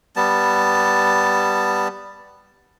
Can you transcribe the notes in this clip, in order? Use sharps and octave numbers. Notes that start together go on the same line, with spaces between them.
G3 B3 A5